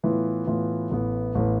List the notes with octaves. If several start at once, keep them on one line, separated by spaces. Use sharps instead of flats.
A2 E3 B3 F4
A2 E3 B3 F4
A1 A2 E3 B3
A1 A2 E3 B3